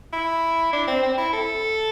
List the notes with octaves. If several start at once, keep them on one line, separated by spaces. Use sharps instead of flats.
E4
D4
C4
C4
E4
A4